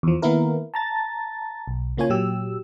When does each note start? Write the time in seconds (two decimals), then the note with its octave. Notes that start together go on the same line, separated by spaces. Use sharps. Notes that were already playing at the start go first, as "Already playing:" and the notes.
0.03 E2 F3
0.22 D#3 A#3 B3 E4 A#4
0.74 A5 A#5 A6
1.67 B1
1.97 C#3 A#3 F4 C#5 G#5
2.10 A#2 F#3 G4 E6